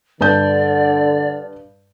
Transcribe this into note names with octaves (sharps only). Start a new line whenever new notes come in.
G2 D3 D5 A5 G6